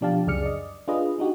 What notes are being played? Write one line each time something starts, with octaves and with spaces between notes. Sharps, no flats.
B2 F3 D4 G4 F5 A5
C#2 F#2 G#4 D5 F6 C#7
D5 D#5
D4 F4 G#4 B4 D#5
D4 D#4 F#4 G4